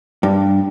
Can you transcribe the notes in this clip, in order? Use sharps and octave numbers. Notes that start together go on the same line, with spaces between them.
G2